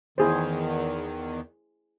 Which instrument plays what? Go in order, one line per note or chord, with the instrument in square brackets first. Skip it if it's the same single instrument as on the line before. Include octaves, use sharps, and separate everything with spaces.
[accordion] E2 D#3 [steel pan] E4 G#4 C5